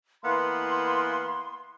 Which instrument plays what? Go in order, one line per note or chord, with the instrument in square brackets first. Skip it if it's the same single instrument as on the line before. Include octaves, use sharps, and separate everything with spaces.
[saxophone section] E3 A#3 B3 [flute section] C6